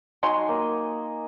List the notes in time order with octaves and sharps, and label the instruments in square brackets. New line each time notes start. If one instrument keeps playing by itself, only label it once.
[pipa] F#3 C6 [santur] D#4 D#5 G#5
[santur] A#3 D#5